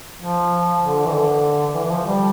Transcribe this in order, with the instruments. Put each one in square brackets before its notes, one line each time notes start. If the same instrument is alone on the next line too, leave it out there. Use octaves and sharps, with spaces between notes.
[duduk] F3
D3
E3
D3
E3
E3
F3
G3